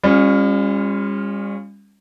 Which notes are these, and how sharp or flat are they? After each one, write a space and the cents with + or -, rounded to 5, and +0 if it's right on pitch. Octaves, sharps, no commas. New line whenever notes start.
G3 +45 C#4 -20 F4 +0